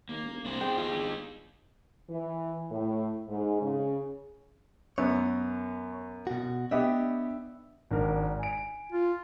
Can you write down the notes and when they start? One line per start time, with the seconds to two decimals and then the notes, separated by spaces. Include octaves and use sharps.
0.09 D#2 A#3
0.23 E1
0.45 C2 D4 C5
0.61 E2 G#3 G5
0.78 D#4 F4 G4
0.93 G1
2.09 E3
2.71 A2
3.28 G#2
3.62 C#3
4.98 F#2 B3 C#5
6.27 B2 F#4
6.71 B3 D4 G4 D#5 E5
7.91 G#1 D4 A#4
8.39 G#5 D7
8.92 F4